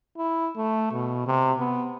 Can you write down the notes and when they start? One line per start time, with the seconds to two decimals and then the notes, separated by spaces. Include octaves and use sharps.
0.18 E4
0.57 A3
0.92 B2
1.27 C3
1.59 B3